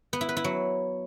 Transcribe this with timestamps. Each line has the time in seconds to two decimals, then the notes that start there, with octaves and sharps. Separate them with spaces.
0.13 B3
0.21 E4
0.29 B4
0.37 E4
0.44 F#3